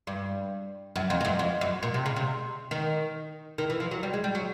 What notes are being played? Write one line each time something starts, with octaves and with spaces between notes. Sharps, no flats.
G2
F#2
F2
F2
F#2
F2
F#2
A#2
C3
C#3
C3
D#3
D#3
E3
F3
F#3
G3
G#3
G3
F#3